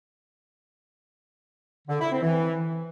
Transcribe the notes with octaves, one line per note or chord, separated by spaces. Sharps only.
D3
E4
C4
E3